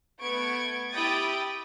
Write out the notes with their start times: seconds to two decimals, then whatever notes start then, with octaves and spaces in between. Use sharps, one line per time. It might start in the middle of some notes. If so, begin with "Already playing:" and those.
0.21 A3 B3 C#6 G#6 D7
0.92 E4 G4 G5 B5 D#6 A6